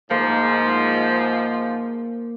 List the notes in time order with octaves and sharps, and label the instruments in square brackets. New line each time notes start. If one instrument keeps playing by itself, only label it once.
[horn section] G#2 F3 [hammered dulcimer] A#3